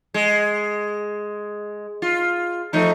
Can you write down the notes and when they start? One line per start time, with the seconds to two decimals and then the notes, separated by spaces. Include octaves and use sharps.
0.14 G#3
2.02 F4
2.73 F3 A3 D#4